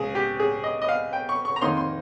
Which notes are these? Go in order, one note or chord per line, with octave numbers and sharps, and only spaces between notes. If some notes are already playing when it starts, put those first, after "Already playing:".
Already playing: C#2 C#3 G#4
G4
G#4
D#5
D#5
F5
G5
C#6
C#6
A#5
F2 D#3 A#3 D#4 C6
C6